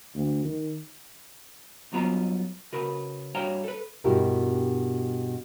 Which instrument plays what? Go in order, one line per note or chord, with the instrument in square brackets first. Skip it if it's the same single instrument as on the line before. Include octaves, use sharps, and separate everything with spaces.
[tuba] D2
D#3
[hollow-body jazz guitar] G2 F#3 B3 F4 F#5 A#5
C#3 F#4 A#4 B4
G2 F#4 C#5 F5 G5 A#5
A4 B4
[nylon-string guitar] G2 B2 E4 F#4 G4 A#4